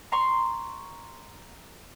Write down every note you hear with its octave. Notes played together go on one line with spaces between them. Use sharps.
A#5 C6 C#6